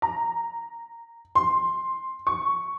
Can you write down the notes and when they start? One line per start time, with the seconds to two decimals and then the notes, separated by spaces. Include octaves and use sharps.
0.02 A#5
1.35 C6
2.27 C#6